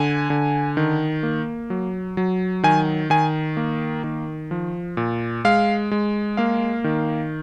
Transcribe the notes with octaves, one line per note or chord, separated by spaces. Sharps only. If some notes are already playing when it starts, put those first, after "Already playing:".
Already playing: D3 G#5
D3
D#3
A#3
F#3
F#3
D#3 G#5
D#3 G#5
A#3
D#3
F3
A#2
G#3 F5
G#3
A#3 F5
D#3